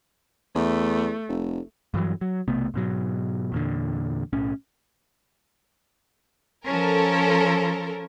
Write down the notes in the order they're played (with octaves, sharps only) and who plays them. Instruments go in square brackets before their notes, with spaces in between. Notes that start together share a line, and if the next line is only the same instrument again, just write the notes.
[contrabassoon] E2 [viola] A3
[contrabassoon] F1
[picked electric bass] G2 E3 F#3
F#3
B1 C3 A3 B3
G#2 B2 F#3
E2 A#2 D3
B1 A2 C#4
[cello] F3 C#4 [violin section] A4 A#4